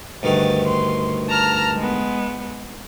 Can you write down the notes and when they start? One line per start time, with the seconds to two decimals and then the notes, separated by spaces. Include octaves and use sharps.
0.23 D2 G2 D#3 A6
0.66 C6
1.28 A5 A#5 F6
1.77 G#3 B3